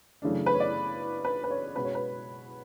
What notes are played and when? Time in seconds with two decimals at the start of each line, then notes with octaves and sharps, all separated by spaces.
0.22 F#2 C#3 E3 A3 D4
0.46 B4
0.54 C#5
0.60 D5
1.25 B4
1.44 B4
1.50 C#5
1.75 B2 G#3 C#4 B4
1.85 C#5
1.95 B4